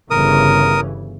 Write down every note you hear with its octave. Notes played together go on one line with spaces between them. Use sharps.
G1 C#3 E3 A#4 D#6